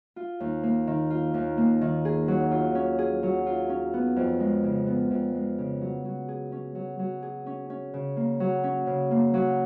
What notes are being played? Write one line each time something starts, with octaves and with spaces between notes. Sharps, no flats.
F4
D#2
A#3
D#3
F4
D#2
A#3
D#3
G#4
F#3
F4
C#4
G#4
F#3
F4
C#4
B3
F2
G#3
C#3
B3
F2
G#3
C#3
F#3
F#3
G#4
C#4
F#3
F#3
G#4
C#4
C#4
C#3
A#3
F#3
C#4
C#3
A#3
F#3